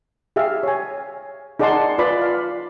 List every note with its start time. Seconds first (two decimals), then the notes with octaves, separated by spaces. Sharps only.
0.36 G4 G#4 E5 F5
0.63 C#5 G#5
1.59 D#4 G#4 D5 F#5 A5 C6
1.98 F4 B4 D5 B5
2.22 F5